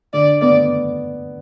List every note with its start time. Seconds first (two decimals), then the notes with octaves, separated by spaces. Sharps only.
0.13 D3 D5
0.41 B3 D5